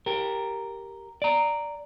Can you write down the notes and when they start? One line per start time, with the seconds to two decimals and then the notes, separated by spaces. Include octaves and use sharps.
0.06 G4 A#4
1.22 D5 A#5